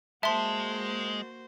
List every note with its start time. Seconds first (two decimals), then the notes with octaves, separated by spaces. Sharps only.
0.23 G#3 A#3 F#4 C5 E5 A5 C6